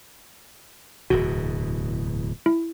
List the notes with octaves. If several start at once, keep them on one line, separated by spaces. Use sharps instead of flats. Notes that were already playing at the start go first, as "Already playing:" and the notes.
D1 E2 B2 F#4
E4